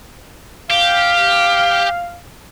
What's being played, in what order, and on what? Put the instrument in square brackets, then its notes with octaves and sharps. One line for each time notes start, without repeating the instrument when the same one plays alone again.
[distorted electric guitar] G4 [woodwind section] F5